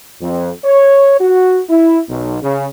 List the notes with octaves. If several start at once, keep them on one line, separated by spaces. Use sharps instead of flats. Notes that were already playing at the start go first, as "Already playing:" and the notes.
F2
C#5
F#4
E4
B1
C#3